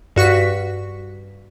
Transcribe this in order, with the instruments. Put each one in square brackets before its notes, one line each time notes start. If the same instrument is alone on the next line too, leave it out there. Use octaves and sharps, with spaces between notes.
[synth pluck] G2 F#4 C#6 B6